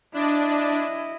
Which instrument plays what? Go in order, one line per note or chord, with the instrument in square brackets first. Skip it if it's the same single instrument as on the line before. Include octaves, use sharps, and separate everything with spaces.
[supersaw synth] D4 [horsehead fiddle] E4 D#5